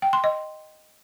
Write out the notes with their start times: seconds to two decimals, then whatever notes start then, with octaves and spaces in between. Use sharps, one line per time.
0.02 G5
0.13 C6
0.24 D#5